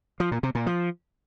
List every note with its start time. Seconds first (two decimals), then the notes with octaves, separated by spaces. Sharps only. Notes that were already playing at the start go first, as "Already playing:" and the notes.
0.20 F3
0.32 A#2
0.43 C3
0.55 A#2
0.66 F3